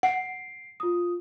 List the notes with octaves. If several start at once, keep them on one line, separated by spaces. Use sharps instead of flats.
F#5 C7 D7
F4 D#6